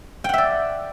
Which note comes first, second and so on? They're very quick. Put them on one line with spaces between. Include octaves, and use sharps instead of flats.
G5 F#5 E5 D5